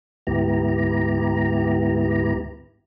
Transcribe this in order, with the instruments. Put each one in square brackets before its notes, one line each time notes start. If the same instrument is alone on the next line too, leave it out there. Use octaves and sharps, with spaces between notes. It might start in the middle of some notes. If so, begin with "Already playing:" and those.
[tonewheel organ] D2 G#2 B3 E4 G4 A#5